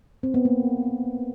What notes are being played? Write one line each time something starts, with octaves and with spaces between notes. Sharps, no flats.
C4
B3
A#3